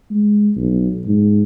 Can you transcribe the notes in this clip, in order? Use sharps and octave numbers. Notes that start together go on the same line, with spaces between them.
G#3
B1
G#2